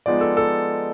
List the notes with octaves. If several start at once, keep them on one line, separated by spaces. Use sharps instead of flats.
F3 G#3 B3 D#4 D5
A4
A4